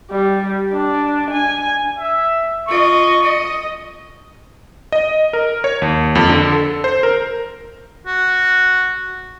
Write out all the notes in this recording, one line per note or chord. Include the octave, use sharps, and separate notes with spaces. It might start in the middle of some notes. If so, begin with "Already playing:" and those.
G3
D4
G#5
E5
F4 D#5 C#6
D#5
D#5
A#4
C#5
D#2
F2
D3
A4
C5
A#4
F#4